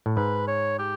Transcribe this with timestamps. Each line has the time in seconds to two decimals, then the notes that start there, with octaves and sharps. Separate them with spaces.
0.06 A2
0.17 G#2 B4
0.47 C#5
0.79 G4